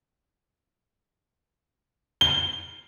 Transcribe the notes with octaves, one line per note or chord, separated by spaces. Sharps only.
G7